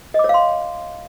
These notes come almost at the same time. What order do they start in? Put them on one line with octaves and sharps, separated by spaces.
D#5 D6 C#5 F5 C6